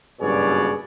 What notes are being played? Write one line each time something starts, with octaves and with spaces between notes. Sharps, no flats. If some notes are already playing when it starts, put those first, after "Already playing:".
F#1 G2 B2 G#4 C#5 D5